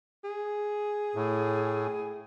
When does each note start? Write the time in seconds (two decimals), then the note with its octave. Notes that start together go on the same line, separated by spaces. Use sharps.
0.24 G#4
1.15 A2